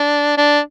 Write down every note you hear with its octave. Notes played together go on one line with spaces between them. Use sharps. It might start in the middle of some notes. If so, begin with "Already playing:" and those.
Already playing: D4
D4